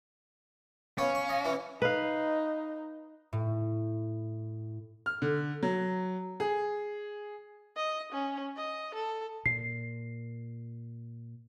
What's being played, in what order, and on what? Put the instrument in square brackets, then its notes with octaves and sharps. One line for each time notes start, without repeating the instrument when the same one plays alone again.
[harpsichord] B3 C#5 [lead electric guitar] C#4 [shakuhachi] F5
[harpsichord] C#6
D#5
[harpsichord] E3 [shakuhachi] E5
[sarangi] D#4 [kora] B4 F5
[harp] A2
[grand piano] F6
D3
F#3
G#4
[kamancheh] D#5
C#4
D#5
A4
[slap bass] A#2 [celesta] C7